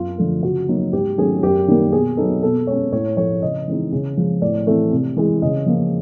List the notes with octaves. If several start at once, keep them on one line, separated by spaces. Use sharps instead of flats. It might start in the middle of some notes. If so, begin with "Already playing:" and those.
Already playing: F#2 F4
D3 F3 A3
C#3 F#4
F#3 A#3 D#4
G#2 G4
D#3 F#3 A3 C#4 G#4
F#2 G4
D#3 G3 A#3
B2 G#4
F#3 B3 D#4 A4
B2 A4
G#3 C#4 C#5
A2 C#5
F3 A3 C#5
C#3 D#5
E3 G#3 C4 D#4
C#3
F3 G#3
A2 D5
E3 A3 C4
C3
E3 G#3
C#3 D#5
F3 A#3